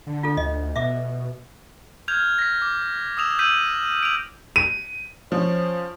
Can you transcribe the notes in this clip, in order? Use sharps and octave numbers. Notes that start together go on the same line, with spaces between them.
D3
F4 A4
D2 D#5
B2 E5 D6
F6 G6 G#6 F7
A#6 B6
D6
D#6 E6 E7 F7
E6 G6 B6 D#7 F#7
D7 F7
D#7
F3 C#4 C5